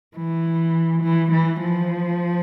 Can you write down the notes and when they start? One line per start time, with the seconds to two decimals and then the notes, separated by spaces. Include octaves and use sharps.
0.16 E3
1.02 E3
1.31 E3
1.60 F3